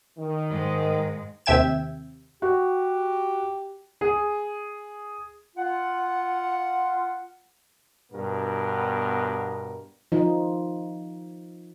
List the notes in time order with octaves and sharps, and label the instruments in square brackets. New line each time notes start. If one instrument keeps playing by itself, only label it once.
[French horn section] D#3
[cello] G#2 G#3
[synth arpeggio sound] D#2 C3 E5 G5 G#6 E7
[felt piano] F#4 [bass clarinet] G4
[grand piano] G#4
[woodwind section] F4 F#5
[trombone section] G2 B2 B3 A#4
[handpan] F3 D#4